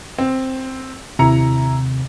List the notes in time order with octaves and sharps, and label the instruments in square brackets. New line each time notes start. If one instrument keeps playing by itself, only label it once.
[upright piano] C4
[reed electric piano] D#2 C3 [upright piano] E4 A#5 C#7